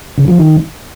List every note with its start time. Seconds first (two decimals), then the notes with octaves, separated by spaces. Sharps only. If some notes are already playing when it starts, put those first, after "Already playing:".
0.18 C#3
0.28 F3
0.38 D#3